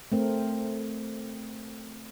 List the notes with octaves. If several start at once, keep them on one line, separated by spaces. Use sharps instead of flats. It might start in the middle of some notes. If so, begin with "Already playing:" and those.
A3 C4 A#4